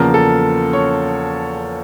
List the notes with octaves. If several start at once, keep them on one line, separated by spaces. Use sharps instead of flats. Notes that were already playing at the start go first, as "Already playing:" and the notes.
Already playing: E2 C#3 F3 A#3 A#4
A4
C#5